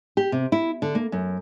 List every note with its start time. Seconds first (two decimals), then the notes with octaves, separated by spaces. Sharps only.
0.17 G4
0.32 C3
0.52 E4
0.82 D3
0.95 A#3
1.12 F#2